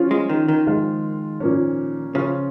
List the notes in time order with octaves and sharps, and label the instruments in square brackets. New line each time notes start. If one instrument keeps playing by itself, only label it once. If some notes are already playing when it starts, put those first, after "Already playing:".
Already playing: [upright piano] F3 C#4 F4
[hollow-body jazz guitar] G#3
D#3
D#3
[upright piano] F3 G#3 F4
A#2 F3 A#3 C#4
[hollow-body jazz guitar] C#3 [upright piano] F3 C#4 F4